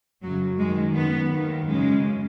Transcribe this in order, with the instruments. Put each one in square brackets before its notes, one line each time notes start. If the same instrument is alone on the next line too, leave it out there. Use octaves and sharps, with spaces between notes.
[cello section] F#2 C#3 F#3
F#2 D#3 G#3
F#2 D#3 B3
D#2 D#3
F#2 C#3 G#3